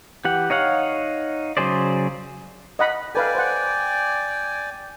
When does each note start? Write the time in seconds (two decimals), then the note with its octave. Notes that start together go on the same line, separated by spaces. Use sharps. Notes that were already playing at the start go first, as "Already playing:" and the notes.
0.25 E3 G4 F#5
0.50 D#4 C#5 F5 F#5
1.57 C#3 F#3 G#4 C5 D5
2.79 D#5 F#5 B5
3.15 A4 B4 D5 F5 G5 G#5
3.35 C5 F#5